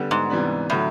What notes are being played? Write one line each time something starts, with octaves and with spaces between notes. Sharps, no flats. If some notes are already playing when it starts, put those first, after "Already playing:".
Already playing: D3 G3 B3
G#2
C3 E3 G3 B3 D4
A2 D3 F#3